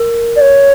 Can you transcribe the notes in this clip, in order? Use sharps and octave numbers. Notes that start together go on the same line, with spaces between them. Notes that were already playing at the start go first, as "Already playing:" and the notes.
Already playing: A#4
D5
C#5